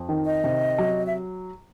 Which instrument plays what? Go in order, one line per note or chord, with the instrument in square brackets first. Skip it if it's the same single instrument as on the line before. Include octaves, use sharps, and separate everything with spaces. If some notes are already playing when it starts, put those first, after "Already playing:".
Already playing: [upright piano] F2
D#3
[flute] D#5
[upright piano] C3
F#3
[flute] E5